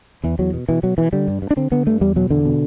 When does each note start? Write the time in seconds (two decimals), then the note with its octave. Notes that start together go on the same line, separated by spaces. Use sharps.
0.24 E2 E3
0.39 E2 F#3
0.53 B2
0.69 B2 E3
0.83 B2 F#3
0.98 B2 E3
1.13 D3 G3
1.28 G2
1.42 G2
1.51 D4
1.57 D3 C4
1.71 D3 B3
1.87 G2 A3
2.01 E2 G3
2.16 B2 F#3
2.30 E2 D3
2.45 B2